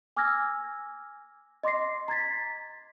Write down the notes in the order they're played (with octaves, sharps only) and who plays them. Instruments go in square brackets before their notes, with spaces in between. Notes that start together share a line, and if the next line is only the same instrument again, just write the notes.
[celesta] G#5 D6 E6 F6 G#6 A#6
D#5 C6 D6 A#6 C7
A#5 G#6 A6 B6